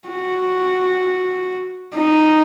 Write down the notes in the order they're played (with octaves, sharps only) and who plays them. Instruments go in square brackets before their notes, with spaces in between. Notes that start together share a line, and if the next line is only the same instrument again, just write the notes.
[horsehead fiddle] F#4
D#4